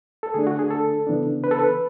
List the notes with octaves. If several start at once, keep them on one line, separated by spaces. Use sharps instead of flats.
A4
D3 A3 D4 G#4
F#4
G#4
A4
C#3 E3 B3 D4
B4
A4
B4